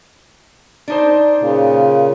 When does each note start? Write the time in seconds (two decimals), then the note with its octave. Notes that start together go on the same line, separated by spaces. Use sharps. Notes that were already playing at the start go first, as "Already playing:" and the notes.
0.88 D4 D#4 C5
1.39 A#2 C#3